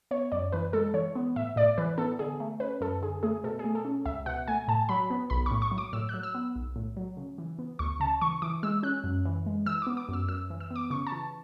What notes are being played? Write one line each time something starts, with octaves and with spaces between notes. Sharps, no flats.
B3 C#5
F#2 D5
E3 B4
G#3 A4
E3 C#5
B3
A2 E5
A2 D5
E3 B4
B3 A4
D3 G#4
A3
C#4 B4
F#2 A4
D3 G#4
A3 G#4
B2 A4
G#4
A3
A4
C#4
C#2 E5
B2 F#5
A3 G#5
A2 A5
F#3 B5
B3
B1 B5
A2 C#6
C#6
F#3
D6
A2 E6
F#3 F#6
E6
B3
B1
A2
F#3
C#3
E3
B3
D2 C#6
C#3 A5
E3 C#6
E3 D6
G#3 E6
C#4 F#6
F#2
E3
G#3
E3 E6
B3 D6
D6
F#2 E6
F#2 E6
E3
E6
B3
D6
C#3 C#6
A5
E3